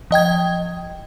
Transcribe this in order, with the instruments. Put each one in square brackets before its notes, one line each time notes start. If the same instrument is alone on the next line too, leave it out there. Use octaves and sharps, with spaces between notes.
[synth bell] F3 D#5 G5 G#6